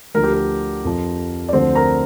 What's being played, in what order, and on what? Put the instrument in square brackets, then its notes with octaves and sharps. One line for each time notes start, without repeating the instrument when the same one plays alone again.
[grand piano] D2 D3 F3 A#4
G4
A#4
F2 F3
D5
D2 D3 F3 C4 C5
A#4 A#5